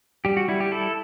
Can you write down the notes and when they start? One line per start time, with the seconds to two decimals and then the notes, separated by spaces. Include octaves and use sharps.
0.25 G3 G4
0.37 F#4
0.48 G3 E4
0.60 G4
0.72 E4 A4